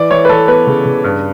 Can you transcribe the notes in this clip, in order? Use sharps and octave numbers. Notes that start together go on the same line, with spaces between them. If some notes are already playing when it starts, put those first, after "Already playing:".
Already playing: E3 D5
E3 C#5
B4
E3 A4
B3 B4
C#3
C#3
G2